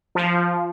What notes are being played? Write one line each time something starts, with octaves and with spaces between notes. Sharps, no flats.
F3